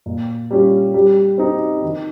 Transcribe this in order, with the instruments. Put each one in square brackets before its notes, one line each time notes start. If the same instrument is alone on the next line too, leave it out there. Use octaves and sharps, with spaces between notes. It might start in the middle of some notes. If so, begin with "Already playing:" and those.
[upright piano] A#2
G3 C#4 F4
G3
C4 D#4
D#3